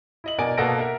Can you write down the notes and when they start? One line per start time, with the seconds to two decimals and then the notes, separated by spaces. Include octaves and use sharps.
0.24 E4 D#5 F#7
0.38 B2 A#4 D5 D#5 G#5 D7
0.57 B2 A#3 B3 A4 A#6 D7
0.78 A#4 E5